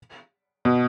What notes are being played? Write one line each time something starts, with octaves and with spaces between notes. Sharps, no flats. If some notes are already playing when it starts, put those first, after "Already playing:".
B2